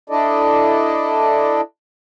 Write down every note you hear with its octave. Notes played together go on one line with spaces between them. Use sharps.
D4 E4 A4 D5 D#5